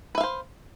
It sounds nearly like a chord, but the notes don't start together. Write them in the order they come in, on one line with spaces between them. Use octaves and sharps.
B4 E5 F5 C5